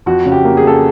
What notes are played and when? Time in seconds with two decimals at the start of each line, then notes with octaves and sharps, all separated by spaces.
0.06 F2 F#4
0.25 C#3
0.32 G4
0.44 A#3
0.57 G#4
0.64 C#3 A4